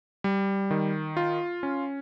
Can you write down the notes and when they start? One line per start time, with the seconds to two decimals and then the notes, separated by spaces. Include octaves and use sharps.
0.24 G3
0.71 D#3
1.17 F4
1.63 C#4